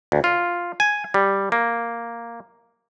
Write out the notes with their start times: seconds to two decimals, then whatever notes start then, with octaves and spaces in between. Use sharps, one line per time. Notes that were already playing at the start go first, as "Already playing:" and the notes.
0.12 D2
0.24 F4
0.80 G#5
1.14 G3
1.52 A#3